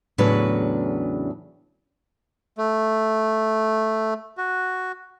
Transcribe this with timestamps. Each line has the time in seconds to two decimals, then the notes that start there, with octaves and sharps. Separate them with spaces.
0.18 E2 A2 C#3 F#3 D4 B4
2.58 A3
4.37 F#4